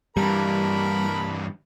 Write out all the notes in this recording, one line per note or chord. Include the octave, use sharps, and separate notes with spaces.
G2 E3 G3 A#4 A5 B5